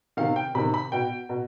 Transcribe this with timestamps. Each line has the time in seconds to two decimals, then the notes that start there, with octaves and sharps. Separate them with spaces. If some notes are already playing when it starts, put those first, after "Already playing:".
0.17 C3 D#3 F5
0.36 G5
0.55 C3 B5
0.58 D#3
0.74 B5
0.92 B2 G5
1.29 B2